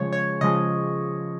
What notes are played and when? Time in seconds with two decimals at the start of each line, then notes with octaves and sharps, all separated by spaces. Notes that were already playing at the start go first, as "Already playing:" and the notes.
Already playing: C#3 F3 G#3 C#5
0.13 C#5
0.41 C#3 F3 G#3 D#5